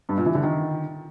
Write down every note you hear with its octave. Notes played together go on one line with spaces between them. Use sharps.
G2
A#2
E3
D3
D#3